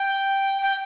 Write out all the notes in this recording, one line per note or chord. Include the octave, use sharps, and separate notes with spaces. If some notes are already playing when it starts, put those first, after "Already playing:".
Already playing: G5
G5